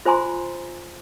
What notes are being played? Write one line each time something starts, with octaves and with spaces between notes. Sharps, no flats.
F4 C5 G#5 A#5 C6